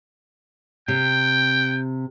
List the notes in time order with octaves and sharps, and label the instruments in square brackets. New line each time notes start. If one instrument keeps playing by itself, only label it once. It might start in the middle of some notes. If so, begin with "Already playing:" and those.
[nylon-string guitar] C3 [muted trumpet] G5